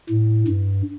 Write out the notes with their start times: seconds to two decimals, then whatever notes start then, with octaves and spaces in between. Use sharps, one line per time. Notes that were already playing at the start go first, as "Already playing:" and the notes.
0.09 A2
0.48 G2